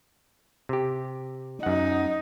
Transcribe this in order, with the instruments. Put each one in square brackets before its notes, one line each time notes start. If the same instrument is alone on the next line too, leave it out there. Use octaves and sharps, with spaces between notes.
[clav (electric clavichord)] C3 G4
[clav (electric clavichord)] F#2 F#5 [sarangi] D#4